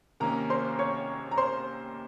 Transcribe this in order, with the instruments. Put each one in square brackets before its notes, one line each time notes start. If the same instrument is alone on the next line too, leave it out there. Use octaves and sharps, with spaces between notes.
[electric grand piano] C3 D#3 A#3 C#4 [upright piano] A#4 A#5
[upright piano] C5 C6
C#5 C#6
A#5
C5 C6